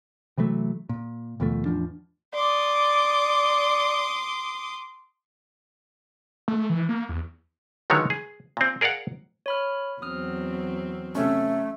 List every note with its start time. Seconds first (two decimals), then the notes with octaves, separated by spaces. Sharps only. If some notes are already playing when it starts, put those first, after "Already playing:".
0.38 C3 E3 F#3 A3
0.89 A#2
1.40 D#2 B2 F3 A3
1.66 A1 E2 F3 D4
2.34 D5 C6 D6 D#6
6.48 A3
6.70 E3
6.89 A#3
7.09 E2
7.90 C#2 D3 D#3 F#3 G#3 C#5
8.10 G#4
8.57 A#2 C4
8.81 G#4 A#4 D5 F5 F#5
9.46 C#5 B5 F6
10.02 E2 F#3 C4 D#6 F6
11.15 C3 A3 C#4